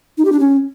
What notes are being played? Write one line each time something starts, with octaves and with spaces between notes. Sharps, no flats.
D#4
G4
D4
C#4